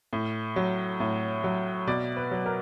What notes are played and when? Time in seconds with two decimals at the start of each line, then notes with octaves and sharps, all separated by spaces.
0.13 A2
0.56 F#3
1.00 A2
1.44 F#3
1.87 B2 D5
2.16 B4
2.31 F#3
2.46 A#4